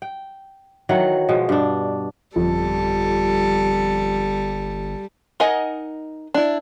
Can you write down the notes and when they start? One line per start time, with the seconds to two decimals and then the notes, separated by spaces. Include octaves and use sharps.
0.02 G5
0.89 D#3 E3 F#3 F#5
1.29 B2 F3 G#3
1.49 G2 D4
2.36 G1 F2 G3 A4
5.40 D#4 A#4 D#5 F#5 G#5
6.34 D4 E4